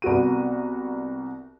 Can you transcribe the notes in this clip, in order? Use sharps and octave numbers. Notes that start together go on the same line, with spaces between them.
C2 B3 F#4 D#7